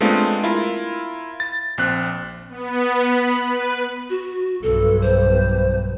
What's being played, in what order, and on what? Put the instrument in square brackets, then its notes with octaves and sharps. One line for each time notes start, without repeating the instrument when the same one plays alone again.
[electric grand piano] G#3 A3 B3 C4 D4 F4
E4 F4 A#4
A6
A#1 C4 F#6
[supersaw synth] B3
B5
B4
[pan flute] F#4
[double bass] B1 G2 [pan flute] A4
[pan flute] C5